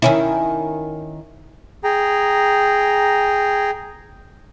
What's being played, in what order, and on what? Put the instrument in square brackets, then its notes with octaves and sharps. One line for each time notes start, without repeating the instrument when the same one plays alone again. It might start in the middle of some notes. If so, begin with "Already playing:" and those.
[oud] D#3 C#4 E4
[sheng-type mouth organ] G#4 G5 A#5